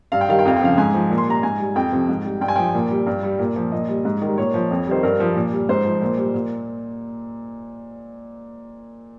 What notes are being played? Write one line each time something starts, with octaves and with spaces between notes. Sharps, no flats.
G2 F5
G5
D#3 G3 F5
G5
F2 F5
G5
C#3 F3 F5
G#2 G#5
F3
A#2
C6
G3 A#5
G#2 G#5
G3
F2 G5
C3 F3
G#2
G3
G2 G5
G#5
F3 G5
A#2
G3
G2
G3
A#2
F3
A#2 D#5
G3
G#2
D#3 G3
A#2 C#5
F3
F2
D#3 G3 C5
G2 A#4
F3
A#2
G3
G#2 C5
F3
A#2
G3
A#2